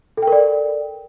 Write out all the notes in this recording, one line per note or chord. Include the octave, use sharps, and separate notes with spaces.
A4 A#4 D5 G5